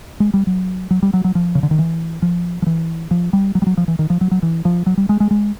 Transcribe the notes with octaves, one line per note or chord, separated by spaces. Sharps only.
G#3
G3
F#3
F#3
G3
F#3
F#3
F3
C#3
D3
D#3
E3
F3
F3
E3
F3
G3
F#3
G3
F#3
F3
E3
D#3
F3
F#3
F#3
E3
F3
F#3
G3
G#3
G#3
G#3